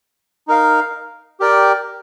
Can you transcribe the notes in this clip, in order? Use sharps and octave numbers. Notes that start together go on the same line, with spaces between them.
D#4 A#4 F5
G4 A#4 D5 G5